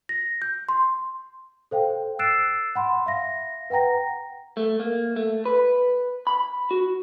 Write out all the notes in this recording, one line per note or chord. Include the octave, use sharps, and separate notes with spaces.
A#6
G6
C6
A4 C5 F5 G5
E6 F#6 A6 C7 D7 E7
F#5 B5 C6
E5 F5 A#6
B4 F#5 G5 A#5 A#6
A3
A#3
A3
B4
B5
F#4